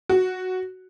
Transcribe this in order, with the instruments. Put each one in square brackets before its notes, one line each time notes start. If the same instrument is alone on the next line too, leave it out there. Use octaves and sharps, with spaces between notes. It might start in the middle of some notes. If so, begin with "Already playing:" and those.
[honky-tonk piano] F#4